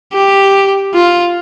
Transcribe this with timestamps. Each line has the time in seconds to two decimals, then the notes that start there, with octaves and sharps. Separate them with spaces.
0.13 G4
0.94 F4